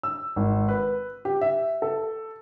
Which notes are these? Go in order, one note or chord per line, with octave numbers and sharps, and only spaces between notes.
E6
G#1
B4
G4
E5
A4